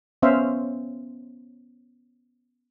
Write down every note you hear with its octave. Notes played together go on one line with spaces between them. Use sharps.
B3 C#4 C5 E5 F5